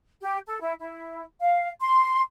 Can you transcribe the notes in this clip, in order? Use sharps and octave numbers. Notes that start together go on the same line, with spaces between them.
G4
A4
E4
E4
F5
C6